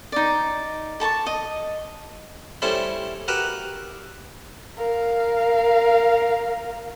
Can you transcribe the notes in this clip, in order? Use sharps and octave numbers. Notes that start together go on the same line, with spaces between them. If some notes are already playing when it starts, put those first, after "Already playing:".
D#4 D5
A4 A5 A#5 C#6
D#5
G3 A3 C#4 E4 A4 C5
F#4 G4 A#4 B4 E5
A#4 F5